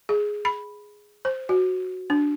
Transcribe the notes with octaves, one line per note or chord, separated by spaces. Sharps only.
G#4
B5
C5
F#4
D4